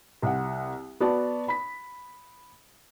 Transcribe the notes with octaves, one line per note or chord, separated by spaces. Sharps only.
C2 F#5
B3 F#4 D5 A5
B5 B6